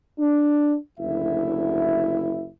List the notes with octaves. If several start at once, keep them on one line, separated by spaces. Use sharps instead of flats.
D4
F#1 D2 E4 E5